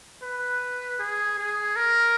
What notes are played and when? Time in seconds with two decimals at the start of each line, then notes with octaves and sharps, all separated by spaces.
0.22 B4
0.99 G#4
1.38 G#4
1.76 A#4